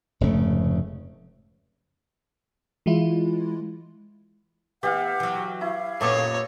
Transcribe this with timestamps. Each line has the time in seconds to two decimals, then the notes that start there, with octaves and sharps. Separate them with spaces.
0.21 F1 G#2 C#3 A3
2.86 E3 G#3 E4 F4
4.83 E3 B3 G4 F5 F#5
5.20 E3 F#3
5.61 E4 F5
6.01 F#2 A#2 B3 A4 C#5 D#5 D6